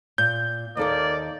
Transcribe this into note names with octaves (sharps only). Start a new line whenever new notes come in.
A#2 G6
D#2 A#3 A4 D5 D#5